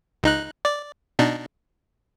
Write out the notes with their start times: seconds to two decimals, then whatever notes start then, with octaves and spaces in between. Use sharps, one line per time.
0.23 C#2 D#4 F#6
0.65 D5
1.19 B2 D4 D#4